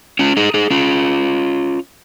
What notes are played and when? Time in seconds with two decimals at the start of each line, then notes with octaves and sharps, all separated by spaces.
0.19 C#4 F4
0.37 D#4 G#4
0.54 D#4 G#4
0.71 C#4 F4